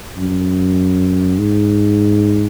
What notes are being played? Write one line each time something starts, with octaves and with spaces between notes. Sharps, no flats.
F#2
G#2